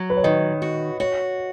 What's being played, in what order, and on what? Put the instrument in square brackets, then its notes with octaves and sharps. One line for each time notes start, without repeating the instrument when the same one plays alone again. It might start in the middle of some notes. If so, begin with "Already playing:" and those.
Already playing: [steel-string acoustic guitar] F#3
[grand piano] B4
C#5
[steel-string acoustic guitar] D#3 [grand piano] D#5
[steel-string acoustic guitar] F#4
[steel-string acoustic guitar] F#4 [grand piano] C#5